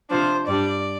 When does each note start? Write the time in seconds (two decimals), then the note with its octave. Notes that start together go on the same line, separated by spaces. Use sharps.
0.10 C3 F3 D4 C5
0.47 G2 G3 D4 D5